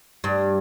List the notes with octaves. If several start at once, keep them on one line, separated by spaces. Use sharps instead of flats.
G2